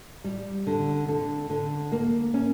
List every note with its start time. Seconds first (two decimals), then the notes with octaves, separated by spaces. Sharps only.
0.24 G3
0.67 D3
1.08 D3
1.50 D3
1.92 A#3
2.34 C#4